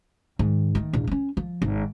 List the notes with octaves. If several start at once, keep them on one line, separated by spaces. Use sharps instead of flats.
G#2 D#3
D#3 A3
A#1 E2
C4 C#4
F3
G#1